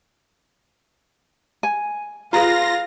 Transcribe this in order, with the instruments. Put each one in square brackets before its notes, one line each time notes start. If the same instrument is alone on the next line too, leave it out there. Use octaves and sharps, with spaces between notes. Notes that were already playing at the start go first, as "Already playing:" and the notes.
[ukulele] G#5
[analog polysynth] F4 A#6 [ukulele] G#4 B4 A#5 [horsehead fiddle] F5